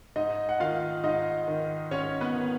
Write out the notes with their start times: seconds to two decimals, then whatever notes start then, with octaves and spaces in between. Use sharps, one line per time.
0.16 G#2 D#4 D#5
0.49 F#5
0.60 D#3 F4 F5
1.04 G#2 D#4 D#5
1.47 D#3
1.91 G#2 C#4 C#5
2.21 B3 B4
2.36 D#3